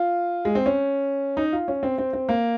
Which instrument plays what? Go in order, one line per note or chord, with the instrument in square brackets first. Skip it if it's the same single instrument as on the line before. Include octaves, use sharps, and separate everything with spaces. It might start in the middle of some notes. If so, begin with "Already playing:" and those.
Already playing: [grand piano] F4
G#3
C4
C#4
D#4
F4
C#4
C4
C4
C4
A#3